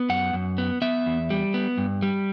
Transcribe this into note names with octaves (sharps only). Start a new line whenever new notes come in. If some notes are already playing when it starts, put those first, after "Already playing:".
Already playing: B3
F#2 F#5
F#2
B3
B3 E5
E2
G3
B3
G2
G3